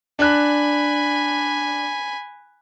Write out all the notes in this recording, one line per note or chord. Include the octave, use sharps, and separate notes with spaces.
D4 G#5 B5 F#6